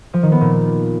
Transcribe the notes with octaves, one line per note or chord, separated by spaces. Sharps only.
F3
D#3
B3
A#2